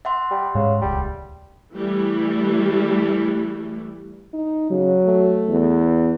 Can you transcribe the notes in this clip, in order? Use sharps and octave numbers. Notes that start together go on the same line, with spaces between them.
E5 F#5 C6
G3
G#2 C#3 G#3
D#1 C#2 G3
E3 G3 A3
D#4
C#3 F#3
A3
E2